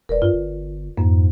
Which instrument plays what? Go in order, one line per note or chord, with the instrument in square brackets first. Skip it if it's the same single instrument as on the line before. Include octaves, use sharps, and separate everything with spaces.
[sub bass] E1 [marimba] A#4 B4 D5
[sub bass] G2 [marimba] F4
[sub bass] G1
[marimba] F2 A#3 [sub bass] G#2